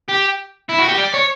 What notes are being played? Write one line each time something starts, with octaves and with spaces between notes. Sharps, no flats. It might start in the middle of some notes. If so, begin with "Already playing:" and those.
G4
E4
F#4
G4
D5
C#5